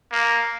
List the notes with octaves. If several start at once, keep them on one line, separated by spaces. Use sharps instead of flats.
A#3